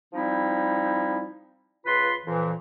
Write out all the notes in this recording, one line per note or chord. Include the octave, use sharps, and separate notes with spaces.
F3 G3 C4 D#4 E4
C#2 F4 B4 B5 C6
F2 A#2 E3